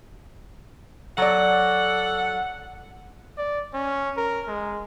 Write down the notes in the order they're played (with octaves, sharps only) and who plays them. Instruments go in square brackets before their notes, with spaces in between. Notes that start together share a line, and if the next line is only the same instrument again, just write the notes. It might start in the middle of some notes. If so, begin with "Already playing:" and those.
[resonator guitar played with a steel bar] F#3 D5 [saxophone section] A4 F#5
[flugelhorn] D5
C#4
A#4
G#3